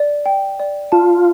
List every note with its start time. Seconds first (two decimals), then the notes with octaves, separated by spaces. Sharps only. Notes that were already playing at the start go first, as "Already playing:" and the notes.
Already playing: D5
0.26 G5
0.60 D5
0.92 F4 A5